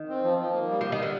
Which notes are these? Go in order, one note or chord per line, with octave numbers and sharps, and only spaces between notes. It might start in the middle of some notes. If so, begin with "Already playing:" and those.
Already playing: D#3
C4
F3
F3
A#3
G3
F3 G3
D#3
D3 G3